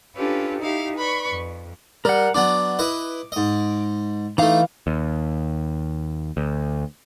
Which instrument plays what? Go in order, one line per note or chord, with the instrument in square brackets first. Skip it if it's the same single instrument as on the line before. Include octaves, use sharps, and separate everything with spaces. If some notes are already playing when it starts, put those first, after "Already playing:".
[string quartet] C#4 D4 F4 G4 A4 B4
D#4 E4 G4 F5
B4 D5 B5 C#6
F2
[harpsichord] G3 [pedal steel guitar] A#4 F#5
[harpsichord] F#3 B3 D4 [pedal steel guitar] D6
[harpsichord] E4 B4 D#5
G#2 D#5
[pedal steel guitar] E3 F5 [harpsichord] A3 D#4
[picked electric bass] D#2
D2